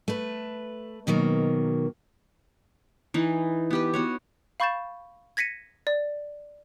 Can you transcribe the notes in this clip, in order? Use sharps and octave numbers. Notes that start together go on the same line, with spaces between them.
A3 B4
B2 D#3 F#3 A#3
E3 D#4
B3 G4 B4
B3 F#4 C#5
F5 B5 C#6 G6 A6 E7
G#6 A#6 B6 C#7 D#7
D5